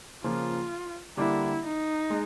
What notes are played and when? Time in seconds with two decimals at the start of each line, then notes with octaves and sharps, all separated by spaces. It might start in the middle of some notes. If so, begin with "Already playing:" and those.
0.24 C#3 F3 A#3 F4
1.17 D3 G3 A#3 D4 E4 G4
1.64 D#4
2.10 G#3